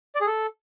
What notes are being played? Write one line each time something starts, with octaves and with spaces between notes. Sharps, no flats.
D5
G#4
A4